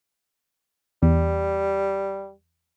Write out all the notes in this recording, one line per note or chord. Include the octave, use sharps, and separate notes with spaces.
E2 G3